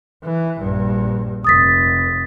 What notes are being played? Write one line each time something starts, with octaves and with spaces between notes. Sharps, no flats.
E3
A#1 G2
F1 D#6 A6 B6